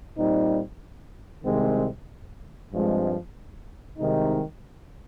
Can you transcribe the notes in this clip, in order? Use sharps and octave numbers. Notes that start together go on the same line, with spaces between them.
A#2 G3 C4 D#4
C2 C3 D#3 G#3 C4
G2 F3 G#3 C4
C2 C3 D#3 G#3 D#4